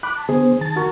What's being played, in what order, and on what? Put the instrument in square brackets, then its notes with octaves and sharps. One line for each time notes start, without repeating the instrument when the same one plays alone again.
[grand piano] B5 [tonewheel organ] D6 F#6
[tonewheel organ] A5
[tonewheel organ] D3 B3 C5 [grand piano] G#4
[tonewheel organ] D#3 A5 A6
[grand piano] F#4 A#4 C#6